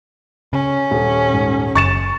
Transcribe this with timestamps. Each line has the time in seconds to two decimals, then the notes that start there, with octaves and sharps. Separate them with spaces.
0.53 C#3 C#4
0.91 D#1
1.34 G#2
1.75 F#1 C#6 A6 E7